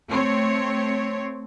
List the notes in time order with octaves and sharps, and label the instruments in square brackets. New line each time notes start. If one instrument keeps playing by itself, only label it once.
[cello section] A3 C4 C#5